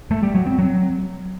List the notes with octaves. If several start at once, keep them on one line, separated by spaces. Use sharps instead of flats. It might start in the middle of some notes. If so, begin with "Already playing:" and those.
A3
G3
F#3
C4
F#3